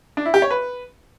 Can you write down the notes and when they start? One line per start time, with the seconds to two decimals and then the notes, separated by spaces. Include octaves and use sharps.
0.17 D4
0.25 E4
0.34 G4
0.42 C#5
0.50 B4